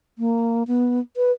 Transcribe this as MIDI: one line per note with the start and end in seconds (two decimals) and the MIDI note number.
0.18 0.63 58
0.67 1.00 59
1.17 1.32 71